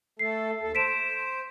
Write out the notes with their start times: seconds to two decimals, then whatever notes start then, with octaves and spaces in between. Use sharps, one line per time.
0.19 A3 A4 C7
0.61 D#2 A4
0.75 C5 B6 D7 E7